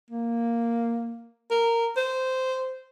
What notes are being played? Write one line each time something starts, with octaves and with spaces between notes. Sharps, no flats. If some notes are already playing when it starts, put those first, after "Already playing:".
A#3
A#4
C5